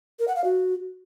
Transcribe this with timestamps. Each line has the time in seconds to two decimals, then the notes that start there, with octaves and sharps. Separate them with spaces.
0.19 A#4
0.28 F#5
0.36 F5
0.44 F#4